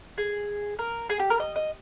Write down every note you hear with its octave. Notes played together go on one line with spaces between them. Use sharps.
G#4
A#4
G#4
G4
A#4
D#5
D#5